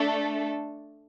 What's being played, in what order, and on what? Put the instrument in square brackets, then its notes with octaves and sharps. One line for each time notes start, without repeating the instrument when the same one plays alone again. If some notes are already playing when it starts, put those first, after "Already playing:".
Already playing: [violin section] A3 D4 A4